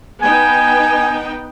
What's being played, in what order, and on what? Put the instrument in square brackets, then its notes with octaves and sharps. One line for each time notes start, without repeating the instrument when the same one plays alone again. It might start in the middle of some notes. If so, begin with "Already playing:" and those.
[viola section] B3 D#4 G5 [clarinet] G#5